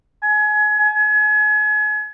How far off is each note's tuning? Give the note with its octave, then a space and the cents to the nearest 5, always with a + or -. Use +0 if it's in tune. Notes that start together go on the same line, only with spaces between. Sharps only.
G#5 +30
G#5 +35